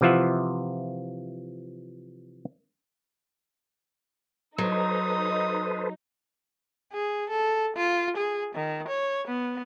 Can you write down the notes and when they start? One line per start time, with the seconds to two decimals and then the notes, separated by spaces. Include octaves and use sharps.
0.01 C3 E3 F3 F4 E5 F#5
4.58 F#3 D#4 A4 B4 C5 D#6
6.93 G#4
7.29 A4
7.76 F4
8.17 G#4
8.55 D#3
8.88 C#5
9.27 B3